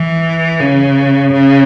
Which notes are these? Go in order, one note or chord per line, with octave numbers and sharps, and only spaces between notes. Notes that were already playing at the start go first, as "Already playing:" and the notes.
Already playing: E3
C#3
C#3